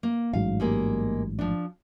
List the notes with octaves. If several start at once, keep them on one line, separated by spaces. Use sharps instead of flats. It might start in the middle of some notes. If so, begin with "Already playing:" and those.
A#3
A1 G#2 F#3 F5
G3 G#3 A#3
F3 D4